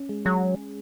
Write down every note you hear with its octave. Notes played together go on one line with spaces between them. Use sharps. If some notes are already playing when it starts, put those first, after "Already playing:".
Already playing: C#4
G#3
F#3 G#4